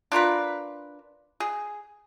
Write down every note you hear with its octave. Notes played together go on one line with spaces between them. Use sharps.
D4 F4 A#4 B4
G#4